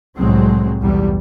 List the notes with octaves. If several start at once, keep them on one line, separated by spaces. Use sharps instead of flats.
C2 A2 F#3 G#3 C4
B1 E2 G3